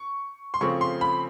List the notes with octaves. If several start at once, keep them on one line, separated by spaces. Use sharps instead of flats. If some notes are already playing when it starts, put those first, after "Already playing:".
Already playing: C#6
C6
C#3 F3 A3 C4 C#6
C6
B5